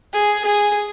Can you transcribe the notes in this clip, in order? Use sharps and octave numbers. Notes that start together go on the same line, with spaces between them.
G#4
G#4